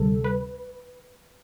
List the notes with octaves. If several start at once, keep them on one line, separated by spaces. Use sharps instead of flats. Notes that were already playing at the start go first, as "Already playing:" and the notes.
Already playing: D2 C3 G3 A4
B4